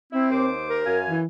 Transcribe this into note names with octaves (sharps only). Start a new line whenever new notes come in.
C4 E4
D#2 C5 D6
A#4
F#2 F5 G#5
E3